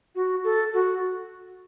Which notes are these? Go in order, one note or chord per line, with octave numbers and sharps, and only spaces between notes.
F#4
A4
F#4